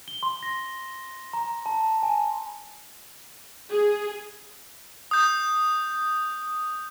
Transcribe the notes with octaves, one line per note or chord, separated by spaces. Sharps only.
G7
C6
A#6
A#5
A5
G#5
G#4
D#6 G6